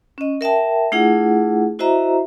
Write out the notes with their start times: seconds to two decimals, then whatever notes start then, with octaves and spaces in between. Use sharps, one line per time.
0.18 C#4 D#5
0.41 A#4 E5 G5 A5
0.92 A3 D4 E4 F4 G#4 F#5
1.79 E4 F#4 C5 D#5 E5 A#5